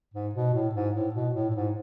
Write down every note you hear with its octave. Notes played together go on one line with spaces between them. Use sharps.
G#2
B2
A2
G#2
A2
B2
A2
A2
G#2